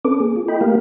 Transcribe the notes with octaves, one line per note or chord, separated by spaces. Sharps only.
C4 C#4 A4 B4 D6
A#3 G#4
F4
E4 A4 D#5 G5 B5
A3 A#3 G4 A#4 F5